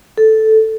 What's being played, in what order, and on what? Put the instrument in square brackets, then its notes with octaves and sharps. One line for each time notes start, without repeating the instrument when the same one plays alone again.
[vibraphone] A4